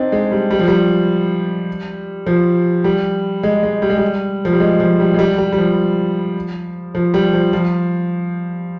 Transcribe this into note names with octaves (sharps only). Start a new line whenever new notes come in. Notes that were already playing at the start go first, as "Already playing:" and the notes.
Already playing: C4 D4 D#4
G#3
G3
G3
F3
G3
F3
G3
G#3
G#3
G3
G#3
G3
F3
G3
G#3
F3
G3
G#3
G3
G3
G3
F3
F3
G3
F3
F3